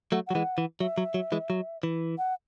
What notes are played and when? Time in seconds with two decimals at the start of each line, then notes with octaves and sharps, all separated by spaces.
0.12 F#3 A3 F#5
0.27 F#3 F#5
0.35 E3 G#3
0.58 E3
0.80 F#3 E5
0.98 F#3
1.14 F#3
1.32 E3 G#3
1.50 F#3
1.83 E3
2.18 F#5